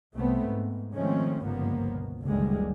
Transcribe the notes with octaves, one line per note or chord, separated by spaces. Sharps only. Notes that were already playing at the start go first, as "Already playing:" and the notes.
C2 A3 B3 C4
G#2
D#3 F3 G#3 A3 C4 C#4
G1 C#2 G#2 F3 A#3 B3
B2
F#1 C#2 D3 D#3 G3 G#3